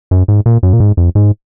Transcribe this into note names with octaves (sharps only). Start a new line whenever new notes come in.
F#2
G#2
A#2
F#2
A#2
G#2
F2
G#2